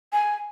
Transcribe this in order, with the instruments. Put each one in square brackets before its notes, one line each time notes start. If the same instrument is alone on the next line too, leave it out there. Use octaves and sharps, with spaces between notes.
[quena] G#5